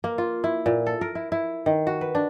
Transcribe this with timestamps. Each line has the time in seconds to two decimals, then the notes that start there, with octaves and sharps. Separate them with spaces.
0.04 A#3
0.18 F4
0.44 E4
0.66 A#2
0.86 A4
1.01 A#4
1.15 E4
1.32 E4
1.66 D#3
1.87 F#4
2.01 B4
2.15 D4